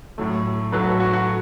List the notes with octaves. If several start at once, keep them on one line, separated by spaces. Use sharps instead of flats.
A2 F#3 A3
A2 F#3 A3 B4
F#4
A4
F#4
F#4